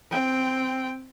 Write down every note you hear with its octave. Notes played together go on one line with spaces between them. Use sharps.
C4 G5